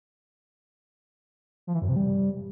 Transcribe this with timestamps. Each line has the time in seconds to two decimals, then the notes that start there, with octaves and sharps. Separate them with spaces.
1.67 F3
1.74 E3
1.82 F#2
1.89 C3
1.96 G3